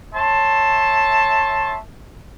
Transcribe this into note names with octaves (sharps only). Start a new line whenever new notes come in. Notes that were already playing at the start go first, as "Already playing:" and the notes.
C#5 E5 A5 C6